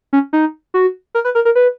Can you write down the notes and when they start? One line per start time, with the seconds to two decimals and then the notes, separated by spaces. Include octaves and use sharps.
0.13 C#4
0.33 D#4
0.74 F#4
1.15 A#4
1.25 B4
1.35 A#4
1.45 A#4
1.55 B4